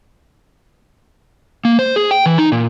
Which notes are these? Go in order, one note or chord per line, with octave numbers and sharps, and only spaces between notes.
A#3
C5
G#4
G5
E3
D#4
A#2